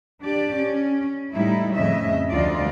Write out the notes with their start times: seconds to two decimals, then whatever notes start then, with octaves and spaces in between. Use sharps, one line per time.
0.22 D4 G4 D5
0.58 C#4
1.33 A2 G3 D#4 E4
1.75 F2 A2 C#3 D#5 E5
2.30 D2 F3 G3 F4 D5 D#5